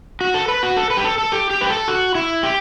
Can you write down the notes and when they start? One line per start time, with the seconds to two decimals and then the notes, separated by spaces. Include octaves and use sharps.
0.21 F#4
0.34 A4
0.48 B4
0.63 F#4
0.77 A4
0.90 B4
0.97 G4
1.04 A4
1.18 A4
1.32 G4
1.50 G4
1.61 B4
1.69 A4
1.88 F#4
2.15 E4
2.43 G4